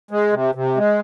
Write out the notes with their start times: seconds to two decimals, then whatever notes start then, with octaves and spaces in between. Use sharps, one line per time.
0.11 G#3
0.32 C3
0.55 C3
0.77 G#3